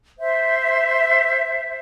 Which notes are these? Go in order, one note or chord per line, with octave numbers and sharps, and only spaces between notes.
C5 E5